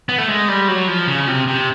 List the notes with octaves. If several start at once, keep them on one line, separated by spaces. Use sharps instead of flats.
B3
A3
G#3
G3
F#3
F3
C#3
C3
C3